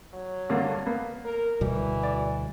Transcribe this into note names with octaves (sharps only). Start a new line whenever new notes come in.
F#3
G2 D3 A#3
A#3 B3
A#4
D2 B2 E3 G3
D5